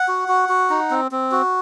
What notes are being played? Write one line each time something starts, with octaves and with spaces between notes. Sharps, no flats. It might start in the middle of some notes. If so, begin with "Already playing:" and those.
Already playing: F#5
F#4
F#4
F#4
D#4
C4
C4
F#4